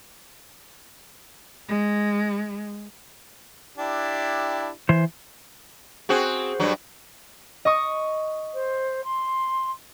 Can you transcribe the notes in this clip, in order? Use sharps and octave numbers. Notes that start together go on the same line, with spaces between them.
G#3
D4 E4 G4
E3 C5
C4 F#4 G#4
G2 F#3
D#5 C#6 D#6
C5
C6